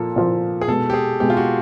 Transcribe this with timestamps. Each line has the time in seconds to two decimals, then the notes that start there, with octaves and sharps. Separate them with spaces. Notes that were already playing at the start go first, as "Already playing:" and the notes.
Already playing: A#2 F3 A#3 A4
0.16 A#2 F3 A#3
0.61 G#4
0.68 B2 G#3 B3 A4
0.90 G4
0.94 G#4
1.20 B2 G#3 B3 G4
1.30 F4
1.37 F#4